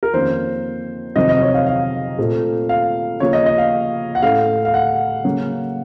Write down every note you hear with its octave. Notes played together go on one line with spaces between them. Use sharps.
A#4
F2 D#3 A#3 C#4 C5
F2 C3 D#3 F#3 C4 D#5
D#5
C#5
F5
F5
A#2 A3 C4
F5
C#3 F3 A#3 C#5
D#5
D#5
F5
F#5
A2 A3 C#4 F5
F5
F#5
C#3 F#3 A#3 C#4